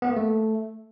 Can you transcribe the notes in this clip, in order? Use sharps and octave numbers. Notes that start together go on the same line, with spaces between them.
B3
A#3
A3